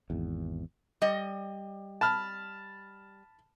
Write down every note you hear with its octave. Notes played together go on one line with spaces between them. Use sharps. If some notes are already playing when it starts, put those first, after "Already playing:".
G#1 E2
G3 D#5
A5 B5 F6